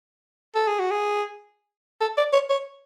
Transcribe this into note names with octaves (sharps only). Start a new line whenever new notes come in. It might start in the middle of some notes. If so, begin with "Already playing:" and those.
A4
G#4
F#4
G#4
A4
D5
C#5
C#5